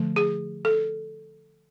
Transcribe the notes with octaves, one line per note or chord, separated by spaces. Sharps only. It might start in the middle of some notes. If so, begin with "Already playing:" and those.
Already playing: D3 F3 A3
G#4
A4